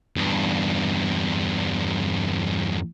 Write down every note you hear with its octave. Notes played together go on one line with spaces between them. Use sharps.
E2 G2